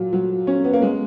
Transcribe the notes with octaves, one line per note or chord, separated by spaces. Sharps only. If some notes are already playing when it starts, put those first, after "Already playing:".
Already playing: A#2 F#3
F#3
C#4
B3
A#3
G#3